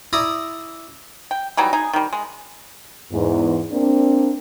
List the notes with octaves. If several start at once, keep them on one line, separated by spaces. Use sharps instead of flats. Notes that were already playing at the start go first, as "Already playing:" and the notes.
E4 D5 A#5 D#6
G5
E3 F#3 G3 D#4
D#4 G#4
D#3 G3
G#3
E2 G#2
A#3 C4 D4